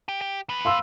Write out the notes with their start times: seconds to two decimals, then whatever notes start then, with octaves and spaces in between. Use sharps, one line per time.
0.08 G4
0.21 G4
0.49 E2 B4
0.65 F5 C6 E6